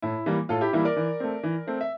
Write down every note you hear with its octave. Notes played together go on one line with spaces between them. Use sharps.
A2 E4
E3 G3 A#3
A2 F4 A4
E4 G4
E3 G3 A#3 E4
A#4 D5
E3
A3 C4
E3
A3 C4
E5